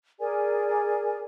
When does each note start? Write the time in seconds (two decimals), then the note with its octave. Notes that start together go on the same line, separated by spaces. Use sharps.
0.19 G#4 A#4 D5 G#5